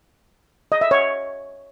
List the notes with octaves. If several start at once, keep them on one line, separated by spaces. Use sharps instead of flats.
D#5
E5
C#5